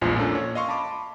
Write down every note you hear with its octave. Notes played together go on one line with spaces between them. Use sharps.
A#1 E2 F3 G#3 F4 G#5
A#2 A#3 C#4 D4 A4
C#5
D#5 F5 C6 C#6
A5 B5 D6